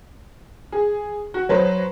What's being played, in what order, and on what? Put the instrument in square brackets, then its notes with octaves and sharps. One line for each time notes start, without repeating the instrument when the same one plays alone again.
[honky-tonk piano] G#4
F#4
F#3 B4 C5